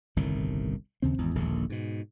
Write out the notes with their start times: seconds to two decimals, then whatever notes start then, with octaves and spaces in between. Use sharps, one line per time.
0.16 G1 C2 A2 D#3
1.02 D#2 C#3 C4
1.18 G#1 E2
1.35 D#1 A#1 D#2 D3
1.70 G#2 B2